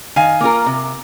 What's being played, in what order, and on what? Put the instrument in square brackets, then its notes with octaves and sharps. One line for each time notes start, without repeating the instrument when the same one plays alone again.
[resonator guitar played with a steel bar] D#3 [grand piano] F5 G#5
[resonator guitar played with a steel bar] A#3 F4 A#4
C3